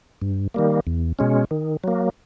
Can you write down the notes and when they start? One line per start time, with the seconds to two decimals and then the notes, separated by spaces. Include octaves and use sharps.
0.22 G2
0.54 D#3 G3 A#3
0.87 E2
1.19 B2 G#3 C#4
1.51 D#3
1.84 F#3 A#3